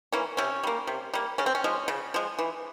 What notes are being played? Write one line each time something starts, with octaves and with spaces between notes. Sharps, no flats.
E3 A#3 C#4
C3 C#4
G3 A#3
C3
G3 A#3
C#3 C#4
C4
C#4
F3 G#3
C#3
F3 G#3
E3